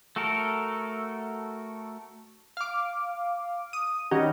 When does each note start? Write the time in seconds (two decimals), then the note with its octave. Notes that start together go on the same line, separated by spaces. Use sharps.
0.16 A3 F#4 A4 A#4
2.57 F5 D6
3.73 D#6
4.11 D#3 G3 C#4 D#4 F#4